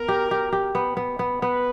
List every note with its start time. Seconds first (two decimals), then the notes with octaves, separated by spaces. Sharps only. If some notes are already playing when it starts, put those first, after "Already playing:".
Already playing: B3 A#4
0.08 G4
0.31 G4
0.52 G4
0.75 B3
0.97 B3
1.19 B3
1.42 B3 B4